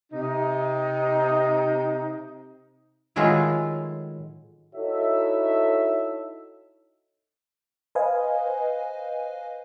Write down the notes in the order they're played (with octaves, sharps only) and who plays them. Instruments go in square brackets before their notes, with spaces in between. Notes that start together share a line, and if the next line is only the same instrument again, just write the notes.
[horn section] C3 D#4
[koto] A2 D#3 F#3 G#3 E4 F4
[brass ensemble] D#4 E4 F#4 A4 C#5 E5
[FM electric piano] B4 C5 D#5 F5 G#5